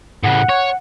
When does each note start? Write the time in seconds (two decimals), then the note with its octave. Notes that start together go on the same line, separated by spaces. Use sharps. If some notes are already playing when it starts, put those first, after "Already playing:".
0.24 A2 C#3 F#5
0.49 C#5